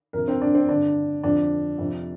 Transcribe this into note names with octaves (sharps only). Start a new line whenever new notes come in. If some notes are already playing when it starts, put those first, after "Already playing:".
F2 C3 A#4
C4
D4
C4
G2 D3 D4
F2 D3 D4
F2 C3